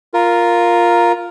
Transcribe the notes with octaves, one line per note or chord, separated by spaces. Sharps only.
F4 A#4